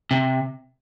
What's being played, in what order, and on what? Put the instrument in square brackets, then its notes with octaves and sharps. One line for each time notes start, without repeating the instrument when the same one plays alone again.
[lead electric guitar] C3